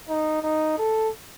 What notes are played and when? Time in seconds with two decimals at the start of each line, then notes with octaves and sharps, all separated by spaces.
0.09 D#4
0.42 D#4
0.78 A4